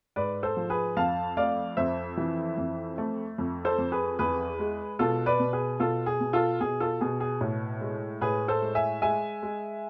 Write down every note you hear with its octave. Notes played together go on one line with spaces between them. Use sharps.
G#2 B4 D5
A4 C5
F3
G#4 B4
F2 F5 A5
A3 D5 F5
F2 C5 E5
E3
F2
A3
F2
A4 C5
F2
G#4 B4
E2 G#4 B4
G#3
B2 F4 A4
B4 D5
B2
G#4 B4
B2 F4 A4
G#4
B2
F4 A4
B2 G#4
F4 A4
B2 G#4
G#4
A2
G#3
A2 G#4 B4
A4 C5
G#3
E5 G#5
G#3 E5 G#5
G#3